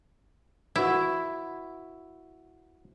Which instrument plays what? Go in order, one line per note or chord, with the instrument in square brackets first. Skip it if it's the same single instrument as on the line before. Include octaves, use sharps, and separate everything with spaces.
[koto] E4 [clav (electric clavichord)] F#4 B4